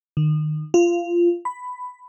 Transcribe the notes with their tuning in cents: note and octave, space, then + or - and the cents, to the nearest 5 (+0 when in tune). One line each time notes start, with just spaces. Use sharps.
D#3 -30
F4 -15
B5 +10